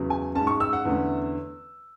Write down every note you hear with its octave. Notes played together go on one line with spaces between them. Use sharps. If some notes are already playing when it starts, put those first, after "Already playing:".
Already playing: E2 C#3 F#3
G#5
G#2 G#3 C#4 A5
C#6
E6
F#5
E2 D3 A3 C#4